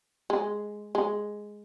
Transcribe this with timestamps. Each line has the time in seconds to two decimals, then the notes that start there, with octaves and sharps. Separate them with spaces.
0.30 G#3
0.95 G#3